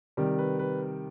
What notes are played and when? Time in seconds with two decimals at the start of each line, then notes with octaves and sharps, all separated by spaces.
0.17 C3 D#3 G3
0.39 B4
0.59 B4